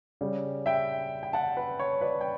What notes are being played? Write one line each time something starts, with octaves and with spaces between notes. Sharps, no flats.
C#3 G3
E5 G5
G5
F#5 A5
B4
C#5
B4 D5
G5